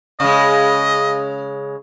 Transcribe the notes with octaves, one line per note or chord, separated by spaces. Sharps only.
C#3 G#3 D#5